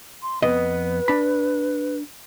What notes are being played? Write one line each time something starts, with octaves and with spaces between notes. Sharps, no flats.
C6
F2 B3 B4 D#5
D4 B5